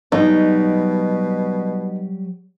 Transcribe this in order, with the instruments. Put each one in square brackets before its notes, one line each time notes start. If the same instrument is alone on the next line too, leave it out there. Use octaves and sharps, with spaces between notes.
[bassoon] B2 [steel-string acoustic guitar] F#3 G3 D5 [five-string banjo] D#4